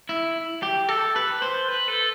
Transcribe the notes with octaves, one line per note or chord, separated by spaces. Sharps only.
E4
G4
A4
B4
C5
B4
A4